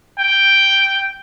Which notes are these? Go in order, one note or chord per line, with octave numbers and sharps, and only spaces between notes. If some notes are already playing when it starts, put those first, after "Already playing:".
G5